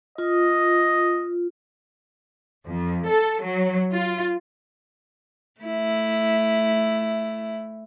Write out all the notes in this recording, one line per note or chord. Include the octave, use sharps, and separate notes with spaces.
F4 D#5
F2
A4
F#3
F4
A3 E4